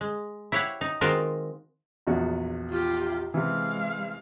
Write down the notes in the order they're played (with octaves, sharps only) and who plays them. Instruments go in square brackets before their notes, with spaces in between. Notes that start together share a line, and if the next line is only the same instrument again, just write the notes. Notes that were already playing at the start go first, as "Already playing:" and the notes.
[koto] G#3
E4 G4 C#5 F5 F#5
D#4
D#3 G#3 C4 F4 F#4 A#4
[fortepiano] A#1 E2 F#4
[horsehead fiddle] F4 G4
[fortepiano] C3 E3 [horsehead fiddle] G#3 F5